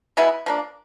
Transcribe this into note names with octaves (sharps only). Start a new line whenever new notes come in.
B2 G#3 B3 E4
F3 A#3 D4